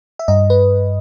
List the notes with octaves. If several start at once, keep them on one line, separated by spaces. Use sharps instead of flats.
E5
G2 D#5
B4